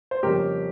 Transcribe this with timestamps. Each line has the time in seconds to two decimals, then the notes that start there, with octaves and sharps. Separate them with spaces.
0.11 C5
0.23 F2 C#3 G3 A#3 C#4 G4 A#4